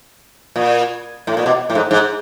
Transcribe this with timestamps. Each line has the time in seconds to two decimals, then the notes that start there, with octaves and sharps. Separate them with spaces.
0.56 A#2
1.27 A2
1.37 A#2
1.46 B2
1.70 A2
1.75 G#2
1.91 G#2